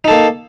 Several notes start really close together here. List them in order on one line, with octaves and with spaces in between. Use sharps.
D#4 A4 A#3